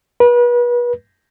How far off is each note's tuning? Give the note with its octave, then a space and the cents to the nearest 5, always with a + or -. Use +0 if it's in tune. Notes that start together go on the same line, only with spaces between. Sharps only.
B4 -35